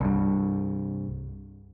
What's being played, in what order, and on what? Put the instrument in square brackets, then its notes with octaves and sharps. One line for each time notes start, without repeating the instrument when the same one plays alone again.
[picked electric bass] C2 G2